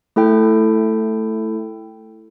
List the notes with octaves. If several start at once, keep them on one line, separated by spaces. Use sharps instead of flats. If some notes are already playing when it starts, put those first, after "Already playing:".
A3 E4 A4 G5